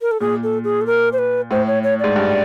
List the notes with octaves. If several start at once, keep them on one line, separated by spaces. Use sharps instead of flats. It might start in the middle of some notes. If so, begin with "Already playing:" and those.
A#4
A4
A#2 G#4
A4
G#4
A4
A#4
C5
B4
A2 C5
C#5
C#5
G#2 D5
G2